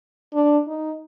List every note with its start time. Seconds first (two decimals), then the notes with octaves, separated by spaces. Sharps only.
0.33 D4
0.67 D#4